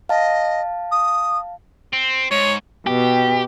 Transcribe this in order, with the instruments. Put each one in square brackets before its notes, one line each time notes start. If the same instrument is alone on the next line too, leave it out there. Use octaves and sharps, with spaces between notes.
[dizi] D#5 [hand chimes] F5 A5
[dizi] D#6
[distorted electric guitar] C4
[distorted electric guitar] G#2 [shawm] C#5
[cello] B2 [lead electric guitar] G4